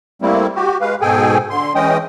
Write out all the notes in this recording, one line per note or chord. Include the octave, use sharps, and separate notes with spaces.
G3 A3 A#3 C4 E4
F#4 G4
G#3 B4 F5
G#2 B2 G#4 A4 G5 G#5
D3 C6
E3 G#3 C#4 D#5 G5 D#6